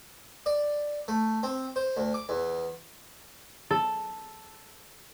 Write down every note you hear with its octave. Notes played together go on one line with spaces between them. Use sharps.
D5
A3
C4
C5
D2
D6
E2
A4